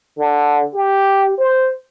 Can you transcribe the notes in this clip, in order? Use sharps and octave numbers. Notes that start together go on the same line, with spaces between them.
D3
G4
C5